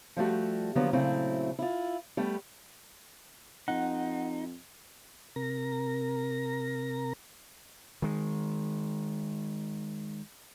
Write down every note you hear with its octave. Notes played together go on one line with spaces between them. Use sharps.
F3 G3 A3 F#4
D3 F3 F#3 A#3 B3
A#2 C#3 F#3 A3 C4 E4
E4 F4
G3 A3 B3
F2 D#4 F#5
C3 A#4 A#6
D#3 G#3